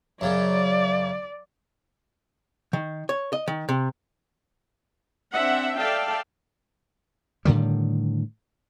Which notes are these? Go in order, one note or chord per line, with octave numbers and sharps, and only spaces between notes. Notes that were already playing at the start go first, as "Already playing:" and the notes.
F#2 C#3 D5
D#3
C#5
D#5
D#3
C3
C4 D4 E5 F#5
A4 D5 E5 F5 G5 A5
A2 D3 D#3 G3